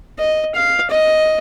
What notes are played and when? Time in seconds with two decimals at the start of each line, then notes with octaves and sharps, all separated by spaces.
0.19 D#5
0.55 F5
0.90 D#5